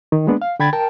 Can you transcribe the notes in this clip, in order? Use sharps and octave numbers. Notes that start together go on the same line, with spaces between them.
D#3
G#3 A#3 B3 D4
F5
D3 G5 B5 G#6 A6
A#4 G5 A5